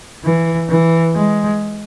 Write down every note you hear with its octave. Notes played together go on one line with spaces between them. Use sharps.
E3
E3
G#3